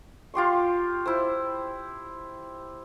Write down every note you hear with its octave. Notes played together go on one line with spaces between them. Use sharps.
F4 G4 C6 C#6
E4 C5